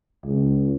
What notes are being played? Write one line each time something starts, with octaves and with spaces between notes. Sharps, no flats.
C#2